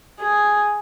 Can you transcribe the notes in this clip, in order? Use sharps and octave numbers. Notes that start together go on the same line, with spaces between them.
G#4